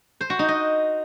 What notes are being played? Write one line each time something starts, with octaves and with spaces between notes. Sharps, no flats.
C5
F#4
D#4
D#5